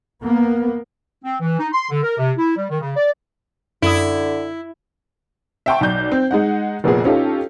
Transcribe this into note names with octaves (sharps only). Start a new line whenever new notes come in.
A#3 B3
C4
E3
D#4
C6
D3
A#4
C3
E4
G3
D#3
C#3
D5
F#2 D3 E4 D#6
E5 F#5 G5 A5 C6 C#6
B1 D5 G6
C4
G#3 D#4 F#5
F1 A#2 B3 G#4
C#4 D#4 F4 G4 A4